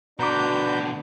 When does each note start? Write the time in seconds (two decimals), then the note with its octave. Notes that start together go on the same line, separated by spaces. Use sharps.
0.19 B2 D3 D4 F#4 B4 A#5 D6 G6